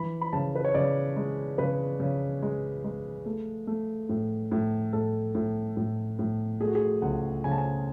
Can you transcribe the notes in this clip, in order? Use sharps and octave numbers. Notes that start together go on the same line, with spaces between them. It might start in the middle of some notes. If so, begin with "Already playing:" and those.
Already playing: E3 B5
B5
C#3 A5
B4
C#5
C#3 D5
G#3
C#3 B4
C#3
G#3
G#3
A3
A3
A2
A2
A2 A4
A2
A2
A2
A3 G#4
F#4
G#4
C#2 F#5
C#3 G#5
A5
G#5